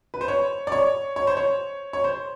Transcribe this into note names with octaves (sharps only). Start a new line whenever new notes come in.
B4
C5
C#5
D5
C#5
C#5
C5
C#5
C#5
C5